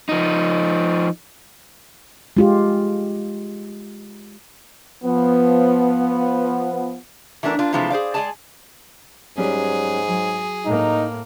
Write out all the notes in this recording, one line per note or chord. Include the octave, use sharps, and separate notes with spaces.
F3 D#4
G#3 F4 G4
F3 B3
E3 A3 B3 D4 A#4
A#3 D4 F4
C3 E3 F3 G#3 A3 C4
G#4 C5 D5 F5
G#3 G#4 D5 G#5 A5
G#2 F#3 G3 C#4 G#4
F#3
A2 A#3 D#4